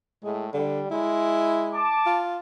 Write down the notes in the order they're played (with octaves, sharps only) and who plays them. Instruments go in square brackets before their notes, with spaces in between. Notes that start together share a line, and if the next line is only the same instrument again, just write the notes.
[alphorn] A2 [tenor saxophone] G#3
[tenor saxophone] D3 [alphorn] G3
[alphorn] G#3 [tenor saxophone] E4
[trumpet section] A5 D6
[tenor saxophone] F4